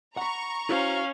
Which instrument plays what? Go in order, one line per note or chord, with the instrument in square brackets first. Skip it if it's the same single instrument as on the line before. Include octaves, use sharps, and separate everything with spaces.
[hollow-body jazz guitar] F#5 B5 [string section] A#5 C#6
[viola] C#4 [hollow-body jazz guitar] E4 F#4 C5 [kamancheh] F5